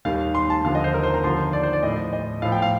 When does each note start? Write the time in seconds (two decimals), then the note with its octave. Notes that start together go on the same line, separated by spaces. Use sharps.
0.05 D#2 D#3 G3 F5
0.35 C6
0.50 A5
0.64 D#2 D3 F3 F5
0.75 D#5
0.84 C5
0.94 A#4
1.03 C5
1.14 A#5
1.24 D#2 D3 F3 C6
1.53 D5
1.63 C5
1.73 D5
1.83 A2 F3 D#5
2.13 D#5
2.42 A2 F3 F5
2.52 G5
2.62 F5